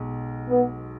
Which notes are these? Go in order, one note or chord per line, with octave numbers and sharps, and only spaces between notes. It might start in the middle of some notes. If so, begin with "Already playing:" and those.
Already playing: B1 B2 G#3
B3